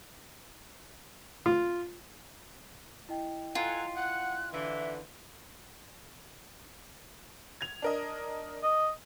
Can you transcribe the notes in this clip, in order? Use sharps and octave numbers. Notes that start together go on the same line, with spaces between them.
F4
E4 D#5 G5
F4 A4 F#5 G#5 A#5
F#5 F#6
D3 E3 E5
G#6 F7
D4 A#4 D#5
D#5